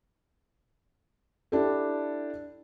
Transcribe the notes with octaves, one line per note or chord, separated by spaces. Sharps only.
D4 E4 G4 A4